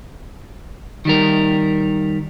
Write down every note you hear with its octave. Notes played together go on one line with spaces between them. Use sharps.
D#3 G3 A#4